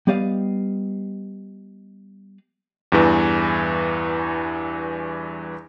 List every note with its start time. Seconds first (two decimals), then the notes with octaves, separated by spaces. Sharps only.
0.07 G3 B3 G4 D5 D#5 F5
2.92 E2 G2 E3